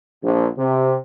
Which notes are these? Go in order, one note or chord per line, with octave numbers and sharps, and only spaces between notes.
A#1
C3